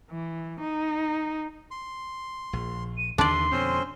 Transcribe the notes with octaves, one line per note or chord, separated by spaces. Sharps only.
E3
D#4
C6
A#1
D#7
D#2 D3 D#3 D4 D5 E5 C6
F2 B2 D3 C4 C#4 C5